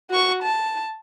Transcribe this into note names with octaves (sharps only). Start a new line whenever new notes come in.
F#4 C#6
A5